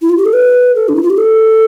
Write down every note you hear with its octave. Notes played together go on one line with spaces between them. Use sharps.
E4
F4
G4
A4
B4
A4
D4
E4
F4
G4
A4